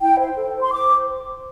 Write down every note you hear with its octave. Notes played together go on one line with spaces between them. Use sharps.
E4 G5
C5
A4
C5
C6
C5 D6
C5